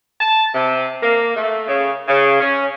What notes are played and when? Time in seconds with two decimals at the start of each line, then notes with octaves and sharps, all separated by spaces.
0.21 A5
0.54 C3
1.03 A#3
1.36 A3
1.68 C#3
2.08 C#3
2.41 C#4